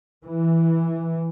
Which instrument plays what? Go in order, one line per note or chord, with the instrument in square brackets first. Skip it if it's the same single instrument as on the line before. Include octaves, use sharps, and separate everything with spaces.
[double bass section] E3